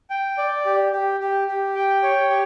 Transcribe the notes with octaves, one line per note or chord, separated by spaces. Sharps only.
G5
D5
G4
G4
G4
G4
G5
C#5
G4